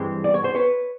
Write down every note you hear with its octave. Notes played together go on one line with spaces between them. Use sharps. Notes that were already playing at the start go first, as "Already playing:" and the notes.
Already playing: G2 E3 G#3 C4
D5
C#5
C5
B4 C#5